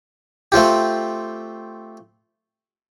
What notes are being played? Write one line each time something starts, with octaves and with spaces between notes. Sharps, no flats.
A3 C4 F4 G4